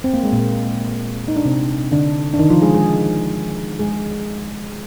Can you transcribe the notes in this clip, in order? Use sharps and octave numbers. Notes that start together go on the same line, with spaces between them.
C4
A#3
G#3
A#2 A#3
D#4
D4
C3 C4
D3 D4
D4
D#3 D#4
F3 F4
G#3 G#4
G#3 G#4
G#3 G#4